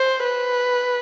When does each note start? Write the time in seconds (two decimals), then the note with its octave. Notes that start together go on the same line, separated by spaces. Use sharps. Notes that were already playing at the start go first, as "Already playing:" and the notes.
Already playing: C5
0.24 B4